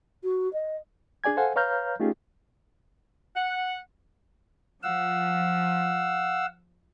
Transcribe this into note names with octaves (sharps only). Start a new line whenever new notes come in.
F#4
D#5
D4 G#4 D5 G#5 G#6
A4 C5 F5 F#5 G#5
B4 C#5 F5 A#5 F6 G6
A3 C#4 D#4 F4 G4 G#4
F#5
F3 F5 F#5 E6